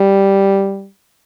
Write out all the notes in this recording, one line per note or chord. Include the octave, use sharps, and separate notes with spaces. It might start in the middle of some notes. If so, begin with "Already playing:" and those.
Already playing: G3